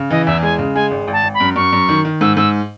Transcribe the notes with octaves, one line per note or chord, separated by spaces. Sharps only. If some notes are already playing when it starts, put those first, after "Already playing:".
Already playing: C#3
E3 D#5
E2 E5
G#3 G#5
C#3
G#3 G#5
G#1
G#1
A5
G#1
B5
F#2
F#2 C#6
F#2
D#3
D#3
G#2 E6
G#2 E6